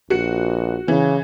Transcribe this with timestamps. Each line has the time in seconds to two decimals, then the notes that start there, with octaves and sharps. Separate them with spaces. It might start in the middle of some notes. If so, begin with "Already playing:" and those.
0.10 A#1 F#4 C#7
0.88 C#3 E3